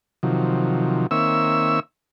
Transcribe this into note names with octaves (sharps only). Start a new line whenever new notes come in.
C3 D#3 F3 F#3
D#3 A#3 C4 C#5 E5 E6